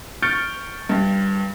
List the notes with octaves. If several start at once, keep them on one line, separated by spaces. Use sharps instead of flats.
C#6 F6 G6 A6 C#7 D7
G2